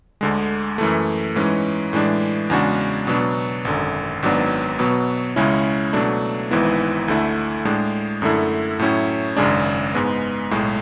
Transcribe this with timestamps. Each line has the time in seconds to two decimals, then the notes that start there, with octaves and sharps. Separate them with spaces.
0.21 D2 D3 G#3
0.78 F#2 E3 A3
1.36 G#2 E3 G#3 C#4
1.93 A2 E3 G#3 D4
2.50 E2 C#3 G#3 D4 F#4
3.07 B2 F#3 B3 D4
3.65 G#1 F#2 D3
4.22 G#1 G#2 F#3 B3 D4
4.79 B2 F#3 B3
5.36 C#2 C#3 G#3 C#4 E4
5.93 B2 F#3 A3 D4
6.51 G#1 G#2 E3 B3 E4
7.08 D2 D3 A3 E4
7.65 A2 G#3 D4
8.22 F#2 D3 A3 E4
8.79 A2 F#3 C#4 E4
9.37 G#1 F#2 C#3 G#3 D4
9.95 G#2 G#3 B3
10.51 B1 A2 G#3